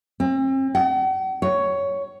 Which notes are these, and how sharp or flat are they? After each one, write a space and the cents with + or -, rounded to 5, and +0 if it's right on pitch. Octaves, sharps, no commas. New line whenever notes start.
C4 +40
F#5 +45
C#5 +10